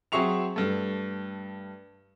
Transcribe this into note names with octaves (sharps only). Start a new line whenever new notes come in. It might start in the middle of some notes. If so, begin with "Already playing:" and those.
F#3 C4 G#4 E5 C#6 F7
G2 A3